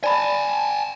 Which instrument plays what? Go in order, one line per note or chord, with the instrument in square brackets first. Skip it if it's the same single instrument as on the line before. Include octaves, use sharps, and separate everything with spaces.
[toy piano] D5 B5 [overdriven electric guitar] G#5 A5